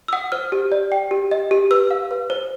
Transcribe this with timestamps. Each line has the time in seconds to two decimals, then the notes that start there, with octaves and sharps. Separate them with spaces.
0.08 E6
0.13 F#5 D#6
0.32 C5 F6
0.52 G4
0.72 D5
0.92 G5
1.11 G4
1.31 D#5
1.51 G4
1.71 B4 E6
1.91 F5
2.11 B4
2.30 C5